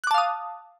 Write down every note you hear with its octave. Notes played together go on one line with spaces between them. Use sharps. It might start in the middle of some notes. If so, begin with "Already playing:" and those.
F5 A5 D6 D#6 F#6